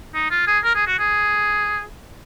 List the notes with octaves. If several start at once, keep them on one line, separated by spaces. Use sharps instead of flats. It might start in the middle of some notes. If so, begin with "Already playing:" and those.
D#4
F4
G#4
A#4
G#4
F#4
G#4